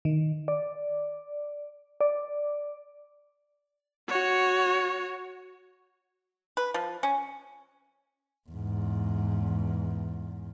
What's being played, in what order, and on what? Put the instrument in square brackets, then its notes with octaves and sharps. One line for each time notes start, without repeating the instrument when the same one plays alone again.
[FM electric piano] D#3
D5
D5
[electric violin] F#4 C#5
[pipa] B4
F3
C#4
[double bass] E2 G#2